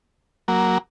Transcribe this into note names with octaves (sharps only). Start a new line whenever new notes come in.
F#3 A#3